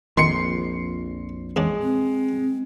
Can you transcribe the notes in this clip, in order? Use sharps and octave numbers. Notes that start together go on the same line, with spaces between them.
A#1 F2 D#3 C6 C7 C#7
E2 G#3 C#4 D4
C4